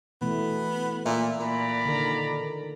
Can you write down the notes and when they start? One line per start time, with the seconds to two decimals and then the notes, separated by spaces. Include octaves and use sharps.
0.21 B2 E3 A3 B3
1.06 A#2 E5
1.40 A#2 D5 A#5 B5
1.85 D3 D#3 A#4